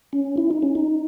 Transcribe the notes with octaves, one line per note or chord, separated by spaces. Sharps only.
C#4
E4
D#4
C#4
D#4